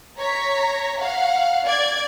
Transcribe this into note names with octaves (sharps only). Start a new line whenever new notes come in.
C#5 A#5 B6
F5 F#5
D5 G#6